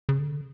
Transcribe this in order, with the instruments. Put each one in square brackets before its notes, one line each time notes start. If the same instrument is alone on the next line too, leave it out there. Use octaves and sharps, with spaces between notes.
[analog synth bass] C#3
D3